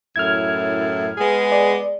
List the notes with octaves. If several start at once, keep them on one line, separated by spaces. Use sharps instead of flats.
F#2 A2 E4 F6 G#6
G#3 B3 G#4
D5